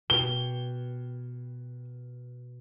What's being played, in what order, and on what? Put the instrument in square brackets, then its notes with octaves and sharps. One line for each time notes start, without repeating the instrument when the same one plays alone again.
[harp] B2 G4 [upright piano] G7